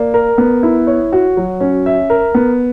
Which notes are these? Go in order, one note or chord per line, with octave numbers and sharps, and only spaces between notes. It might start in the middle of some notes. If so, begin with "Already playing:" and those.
Already playing: A#3 D5
A#4
B3
E4
C#5
F#4
F#3
C#4
E5
A#4
B3